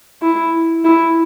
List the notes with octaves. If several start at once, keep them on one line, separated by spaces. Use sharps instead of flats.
E4
E4